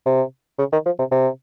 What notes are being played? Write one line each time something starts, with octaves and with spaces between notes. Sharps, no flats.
C3
C#3
D#3
F3
C3
C3